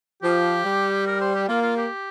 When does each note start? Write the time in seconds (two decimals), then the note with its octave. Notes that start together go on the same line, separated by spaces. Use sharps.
0.22 F3 G4
0.64 G3
1.07 A#4
1.21 C5
1.35 G4
1.48 A#3 F4
1.62 F4
1.77 G4